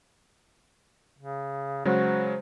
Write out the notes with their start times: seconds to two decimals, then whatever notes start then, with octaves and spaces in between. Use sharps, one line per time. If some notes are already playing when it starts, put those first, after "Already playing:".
1.18 C#3
1.85 C#3 F#3 G#3 F#4 C5